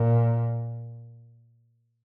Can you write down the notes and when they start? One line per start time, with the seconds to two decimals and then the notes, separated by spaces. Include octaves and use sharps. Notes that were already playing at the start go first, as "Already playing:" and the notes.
Already playing: A#2